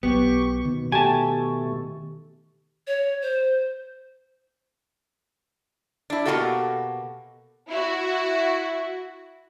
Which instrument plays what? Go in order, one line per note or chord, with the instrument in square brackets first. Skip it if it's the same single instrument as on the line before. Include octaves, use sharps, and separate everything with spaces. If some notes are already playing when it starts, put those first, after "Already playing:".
[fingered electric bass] B1 F#3 [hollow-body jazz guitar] B3 [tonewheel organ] G4 C#6
[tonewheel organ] B2 [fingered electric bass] D#3
[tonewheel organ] B2 A3 [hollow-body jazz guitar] G4 [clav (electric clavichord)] G#5 A5
[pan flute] C#5
C5
[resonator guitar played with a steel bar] D4 E4
B2 E3 A#3 F#4 G4 A4
[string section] E4 F#4